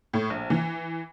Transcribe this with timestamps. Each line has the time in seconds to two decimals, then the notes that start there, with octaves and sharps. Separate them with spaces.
0.13 A2
0.30 A#1
0.50 E3